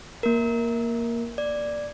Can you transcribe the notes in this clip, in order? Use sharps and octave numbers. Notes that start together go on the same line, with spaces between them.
A#3 A#4
D5